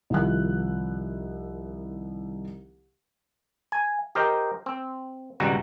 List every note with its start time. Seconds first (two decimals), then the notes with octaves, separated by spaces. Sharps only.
0.10 C2 D#3 F3 E4 F#6
3.72 G#5
4.15 G4 A#4 C5 D#5 G5
4.66 C4
5.40 G#1 C#2 B2 G3 F#4 A#5